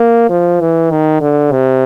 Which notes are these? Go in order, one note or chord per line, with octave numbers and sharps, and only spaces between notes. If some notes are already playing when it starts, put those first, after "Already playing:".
Already playing: A#3
F3
E3
D#3
D3
C3